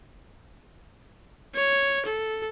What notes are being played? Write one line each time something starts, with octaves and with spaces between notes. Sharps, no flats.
C#5
A4